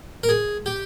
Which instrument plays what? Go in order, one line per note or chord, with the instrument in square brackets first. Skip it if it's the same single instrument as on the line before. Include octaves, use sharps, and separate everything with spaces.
[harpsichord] A#4
G#4
G4